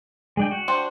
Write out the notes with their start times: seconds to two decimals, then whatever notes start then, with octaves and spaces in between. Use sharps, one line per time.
0.37 G#3 D4 G5
0.51 F#4
0.68 D4 C5 G5